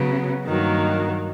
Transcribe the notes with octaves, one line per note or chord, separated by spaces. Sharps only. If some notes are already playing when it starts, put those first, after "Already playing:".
Already playing: C#3 F#3 B3
G2 D#3 F#3 A#3